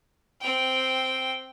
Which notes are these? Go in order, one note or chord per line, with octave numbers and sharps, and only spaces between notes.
C4 G5